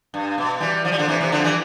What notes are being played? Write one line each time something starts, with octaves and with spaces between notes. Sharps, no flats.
G2
B2
E3 G3
F3
G3
D3 F3
C3 E3
C3 E3
D3 F3
E3 G3